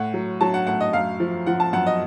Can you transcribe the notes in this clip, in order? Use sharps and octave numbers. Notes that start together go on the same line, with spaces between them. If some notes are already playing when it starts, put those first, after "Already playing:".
Already playing: A2 F#5
F#3
F#3 A5
F#5
A2 F#5
D#5
F#2 F5
F3
F3 F#5
A5
F#2 F#5
D#5